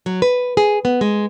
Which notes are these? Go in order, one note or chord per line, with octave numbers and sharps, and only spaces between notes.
F#3
B4
G#4
B3
G#3